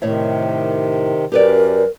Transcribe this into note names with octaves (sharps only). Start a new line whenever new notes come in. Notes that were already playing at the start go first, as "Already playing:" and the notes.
A2 C3 D#3 C#5 E5
F#2 F#3 G4 A#4 B4 D5